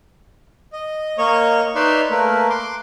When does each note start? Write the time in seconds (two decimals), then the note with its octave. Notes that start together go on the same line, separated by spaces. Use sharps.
0.73 D#5
1.18 A#3 C#5 D#5 C#6
1.75 D#4 B4 C#5 D5 E5 C6
2.10 A3 A#3 A#4 B4
2.50 C6 D6